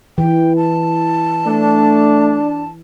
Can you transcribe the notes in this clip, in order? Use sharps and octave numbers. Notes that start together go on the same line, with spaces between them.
E3 G5
A5
A3 D4